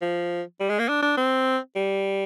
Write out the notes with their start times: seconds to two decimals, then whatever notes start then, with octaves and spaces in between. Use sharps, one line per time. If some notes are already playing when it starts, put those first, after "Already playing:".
0.02 F3
0.60 G3
0.69 G#3
0.79 A#3
0.89 D4
1.03 D4
1.17 C4
1.76 G3